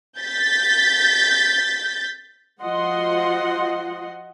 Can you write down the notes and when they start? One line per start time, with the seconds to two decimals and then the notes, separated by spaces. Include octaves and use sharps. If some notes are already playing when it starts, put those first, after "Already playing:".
0.19 G6 A6 B6
2.62 F3 F4 F#4 D#5 F#5 C6